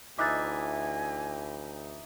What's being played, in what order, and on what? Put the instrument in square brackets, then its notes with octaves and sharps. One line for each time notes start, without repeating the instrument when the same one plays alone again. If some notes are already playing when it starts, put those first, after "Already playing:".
[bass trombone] D2 [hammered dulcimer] E3 D#4 E5 [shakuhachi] G#5 [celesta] D6 F#6 A6